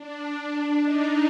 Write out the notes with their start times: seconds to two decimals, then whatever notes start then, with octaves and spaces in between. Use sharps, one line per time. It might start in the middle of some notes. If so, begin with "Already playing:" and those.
Already playing: D4
0.82 D#4